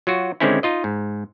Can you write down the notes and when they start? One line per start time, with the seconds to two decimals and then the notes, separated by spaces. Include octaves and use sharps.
0.07 F#3 F4 F#4
0.40 D3 D#3 G#3 C4 C#4 E4
0.63 D#4 F4 D#5
0.84 G#2